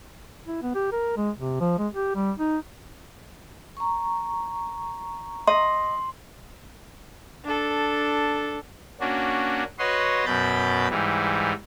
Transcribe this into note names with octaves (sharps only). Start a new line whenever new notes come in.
E4
B3
G4
A#4
G#3
C3
F3
G#3
G4
G3
D#4
A#5 C#6
D#5 C6
D4 A4
A#3 C#4 D4 F#4
F#4 B4 C#5 D#5 C6
F#2 B2 B5 G6 A6
G#2 E3 G3